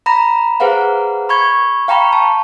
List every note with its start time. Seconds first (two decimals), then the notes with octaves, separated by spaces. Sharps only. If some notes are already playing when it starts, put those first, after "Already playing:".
0.06 A#5 B5 A#6
0.60 G#4 B4 C5 F5 F#5 A#5
1.29 B5 C#6 G#6
1.88 F5 G5 A#5 B5 C#6
2.13 A5